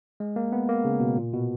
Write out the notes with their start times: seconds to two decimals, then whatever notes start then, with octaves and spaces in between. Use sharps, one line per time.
0.20 G#3
0.36 A#3
0.52 B3
0.69 A#3
0.85 C#3
1.00 B2
1.17 A#2
1.33 B2